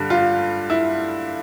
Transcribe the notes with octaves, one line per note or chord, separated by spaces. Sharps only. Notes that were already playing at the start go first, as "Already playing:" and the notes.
Already playing: G2 D3 G3
F4
E4